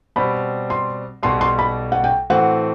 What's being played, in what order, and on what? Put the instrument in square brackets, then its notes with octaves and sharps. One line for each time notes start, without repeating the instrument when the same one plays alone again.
[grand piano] B2 G3 C4 [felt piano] B5
[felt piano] C6
[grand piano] B1 B2 G3 [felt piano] C6
[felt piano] C6
B5
F#5
G5
[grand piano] A2 E3 A3 C4 F#4 [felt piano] F#5